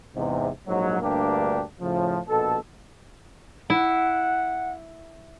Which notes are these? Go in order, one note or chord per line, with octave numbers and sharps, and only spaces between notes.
E2 G#2 C3
A#1 G#2 F#3
D2 G2 A#3 D4 G4
A2 C#3 F3
A#1 B2 A4
E4 F#5